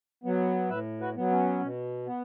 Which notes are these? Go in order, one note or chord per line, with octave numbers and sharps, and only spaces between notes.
F#3 B3
A2 B4 E5
F#4 B4
F#3 B3
C#4
B2
B3